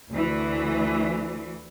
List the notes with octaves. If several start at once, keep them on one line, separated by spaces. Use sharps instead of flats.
D2 E3